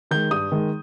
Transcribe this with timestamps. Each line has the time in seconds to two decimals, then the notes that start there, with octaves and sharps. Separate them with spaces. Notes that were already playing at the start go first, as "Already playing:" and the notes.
0.11 D#3 G#3 G6
0.31 G2 D#6
0.52 D#3 G#3